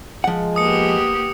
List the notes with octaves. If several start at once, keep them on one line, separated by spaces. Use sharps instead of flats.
F3 G#3 F#5
A#3 B3 G4 D#6 C#7